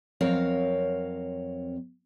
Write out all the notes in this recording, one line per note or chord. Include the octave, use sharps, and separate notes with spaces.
F2 F#3 C4 A#4 C#5 F5